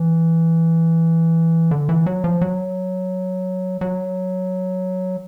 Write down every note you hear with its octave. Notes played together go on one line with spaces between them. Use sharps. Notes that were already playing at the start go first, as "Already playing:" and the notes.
Already playing: E3
D3
E3
F#3
F3
F#3
F#3